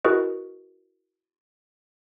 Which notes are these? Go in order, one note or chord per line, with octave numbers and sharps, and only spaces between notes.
E4 F#4 G#4 A#4 B4 D#5